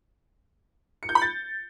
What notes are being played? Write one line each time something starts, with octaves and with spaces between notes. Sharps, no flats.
C#7
G6
B5
A6